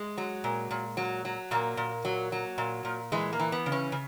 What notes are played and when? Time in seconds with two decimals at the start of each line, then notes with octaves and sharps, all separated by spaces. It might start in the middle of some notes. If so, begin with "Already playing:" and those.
Already playing: G#3
0.18 F#3
0.44 A#2
0.71 A#2
0.97 F#3
1.25 F#3
1.51 A#2 A#3
1.77 A#2
2.05 F#3
2.32 F#3
2.58 A#2
2.85 A#2
3.12 E3 G#3
3.33 A#3
3.39 E3
3.52 B3
3.66 C#3
3.72 C#4
3.92 C#3